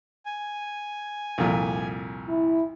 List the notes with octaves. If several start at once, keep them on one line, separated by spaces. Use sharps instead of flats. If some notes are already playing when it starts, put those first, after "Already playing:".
G#5
C2 F2 A#2
E4